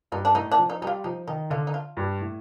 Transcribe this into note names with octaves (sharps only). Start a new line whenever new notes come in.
G2 D#4
D4
A2 D#4
D4
F3
D#4
G3 D#4
F4
F3 D#4
D#3 D#4
D3 F4
D#4
F4
G2
A2